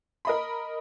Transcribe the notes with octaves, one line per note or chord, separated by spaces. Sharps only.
A#4 D#5 B5